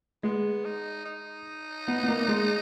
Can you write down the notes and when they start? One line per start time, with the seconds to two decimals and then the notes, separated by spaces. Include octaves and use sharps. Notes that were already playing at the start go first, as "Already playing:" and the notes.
0.23 G#3 B3
0.65 D#4
1.05 D#4
1.88 B3
2.03 B3
2.08 A#3
2.28 G#3